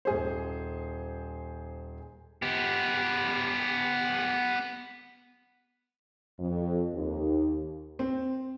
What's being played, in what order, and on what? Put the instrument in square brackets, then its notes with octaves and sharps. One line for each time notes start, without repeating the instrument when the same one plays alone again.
[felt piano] D#1 G#4 C5
[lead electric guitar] B3 G4
[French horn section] F2
D#2
[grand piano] C4